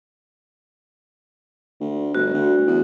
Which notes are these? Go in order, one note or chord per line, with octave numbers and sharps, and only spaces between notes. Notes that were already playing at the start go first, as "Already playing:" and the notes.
D2
G1 F#4
D2
E2